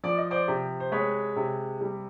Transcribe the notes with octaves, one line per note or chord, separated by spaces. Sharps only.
F3 D5
D#5
C5 D5
C3
C5
G#3 B4 C#5
C3
G3